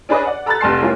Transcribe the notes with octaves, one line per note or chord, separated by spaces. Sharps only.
C#4 D4 G#4 B4 D5 D#5
D5 F#5
A4 A#5 B5 F6 F#6 A6
F1 A#1 A3 A5 C6 C7
G#3 A#3 C#4 E4 F4 G4